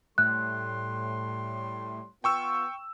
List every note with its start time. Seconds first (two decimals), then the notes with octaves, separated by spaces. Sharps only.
0.18 A2 G3 A4 C6 F#6
2.24 B3 F4 G5 C#6 E6